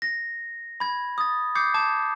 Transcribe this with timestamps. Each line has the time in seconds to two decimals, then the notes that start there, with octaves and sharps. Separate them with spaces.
0.02 A#6
0.80 B5 G#6
1.18 D#6 A6
1.55 D6 D#6 G6 G#6 C7 C#7
1.74 A5 D6 G#6